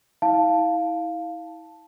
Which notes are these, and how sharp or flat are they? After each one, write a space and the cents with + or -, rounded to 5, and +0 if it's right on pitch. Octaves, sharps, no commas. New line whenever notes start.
E4 -35 F5 +0 A5 +0